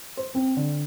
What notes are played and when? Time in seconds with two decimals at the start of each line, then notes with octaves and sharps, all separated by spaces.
0.17 C5
0.35 C4
0.57 D3